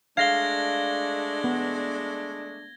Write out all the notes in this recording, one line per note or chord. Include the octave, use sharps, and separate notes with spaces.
G#3 A3 D4 F5 G#6 A#6 G7
B3